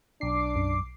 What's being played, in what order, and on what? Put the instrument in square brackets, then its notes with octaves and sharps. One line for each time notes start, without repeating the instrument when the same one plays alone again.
[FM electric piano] B1 C7 [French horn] D4 [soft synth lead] D6
[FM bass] F#2